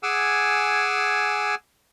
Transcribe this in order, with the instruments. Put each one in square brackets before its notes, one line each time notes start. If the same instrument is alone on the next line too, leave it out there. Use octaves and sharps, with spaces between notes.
[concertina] G#4 F#5 G#5 D6 E6